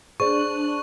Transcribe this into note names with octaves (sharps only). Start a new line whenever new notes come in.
D4 G#4 C5 D5 C#6 F#6